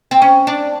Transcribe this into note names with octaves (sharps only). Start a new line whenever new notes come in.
C4
C#4
D4